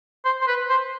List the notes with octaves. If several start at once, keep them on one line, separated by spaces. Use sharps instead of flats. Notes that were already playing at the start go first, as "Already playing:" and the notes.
C5
C5
B4
C5